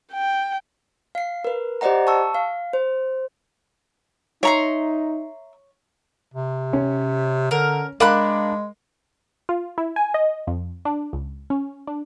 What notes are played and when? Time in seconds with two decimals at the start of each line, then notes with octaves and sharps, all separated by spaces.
0.13 G5
1.15 F5 C7
1.44 A#4 B4
1.81 G4 C5 D5 D#5 F#5 A#5
2.07 A5 C#6 E6
2.35 F5
2.73 C5
4.43 D#4 C#5 E5 A#5 C6
6.34 C3
6.73 C#4
7.51 D3 A#4
8.00 G#3 D4 A#4 F5 B5 D6 F#6
9.49 F4
9.78 E4
9.96 G#5
10.14 D#5
10.47 F2
10.85 D4
11.13 C#2
11.50 C#4
11.87 D4